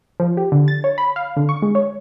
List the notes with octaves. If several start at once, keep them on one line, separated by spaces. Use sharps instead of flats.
F3
G4
D3
A6
C#5
B5
F5
D3
C#6
G#3
C#5